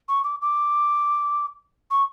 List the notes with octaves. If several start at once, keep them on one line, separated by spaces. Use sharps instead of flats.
C#6
D6
D6
C#6